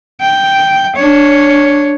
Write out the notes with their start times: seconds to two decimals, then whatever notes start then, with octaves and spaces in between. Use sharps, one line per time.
0.21 G5
0.96 D4 C#5